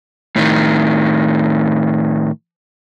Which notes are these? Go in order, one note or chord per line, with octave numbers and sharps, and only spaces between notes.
A2 D#3